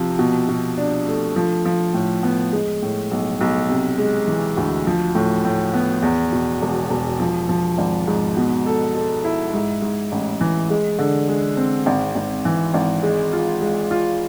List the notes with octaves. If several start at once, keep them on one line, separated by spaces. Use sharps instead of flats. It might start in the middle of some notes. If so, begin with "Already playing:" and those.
Already playing: C3 F3
B2
B2
D4
A3
F3
F3
A2
B3
G#3
A2
B1
B1
C3
G#3
E3
D2
F3
A2
A2
B3
E2
B2
E1
E1
F3
F3
G#1
G#2
B2
A4
A4
E4
G#2
G#2
A1
E3
G#3
D3
G#3
C4
G#1
G#1
E3
G#1
G#3
F4
G#3
F4